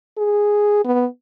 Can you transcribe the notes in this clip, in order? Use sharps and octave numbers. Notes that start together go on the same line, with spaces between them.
G#4
B3